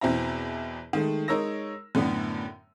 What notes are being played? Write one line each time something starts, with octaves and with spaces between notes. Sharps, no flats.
E2 B2 C4 E4 E5 A#5
D#3 G#3 A3
G#3 D#4 A#4 C#5 E6 A#6
F#2 A2 D3 B3